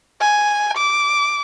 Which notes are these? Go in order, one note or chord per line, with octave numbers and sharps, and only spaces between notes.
G#5
D6